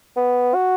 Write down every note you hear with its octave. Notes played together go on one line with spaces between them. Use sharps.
B3
F#4